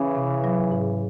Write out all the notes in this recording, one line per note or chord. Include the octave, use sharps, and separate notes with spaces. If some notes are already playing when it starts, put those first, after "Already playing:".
Already playing: C#3 E3 C#4
C3
F#3
G#2